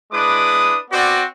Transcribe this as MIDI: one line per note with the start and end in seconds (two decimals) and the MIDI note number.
0.11 0.76 56
0.11 0.76 62
0.11 0.76 64
0.11 0.76 71
0.11 0.76 86
0.11 0.76 87
0.90 1.22 59
0.90 1.22 60
0.90 1.22 66
0.90 1.22 74